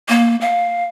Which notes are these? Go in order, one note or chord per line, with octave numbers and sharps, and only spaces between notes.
A#3
F5